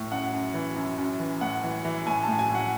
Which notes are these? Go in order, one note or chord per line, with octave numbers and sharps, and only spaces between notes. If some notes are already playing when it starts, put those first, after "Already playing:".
Already playing: A2
F#2 F#5
F#2
E3
F#2
F#2
E3
A2 F#5
E3
E3
A2 G#5
A2 A5
G#5
A2 F#5